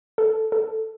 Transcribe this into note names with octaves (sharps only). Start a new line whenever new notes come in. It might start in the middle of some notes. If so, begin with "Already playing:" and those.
A4
A4